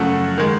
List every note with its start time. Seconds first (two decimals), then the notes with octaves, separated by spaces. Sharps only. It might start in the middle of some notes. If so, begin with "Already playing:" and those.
Already playing: F#2 C#3 F3 A3 F#5
0.38 D#3 G#3